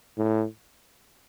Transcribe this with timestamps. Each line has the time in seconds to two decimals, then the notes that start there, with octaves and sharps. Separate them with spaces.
0.17 A2